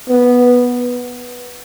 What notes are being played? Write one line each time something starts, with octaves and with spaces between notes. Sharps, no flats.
B3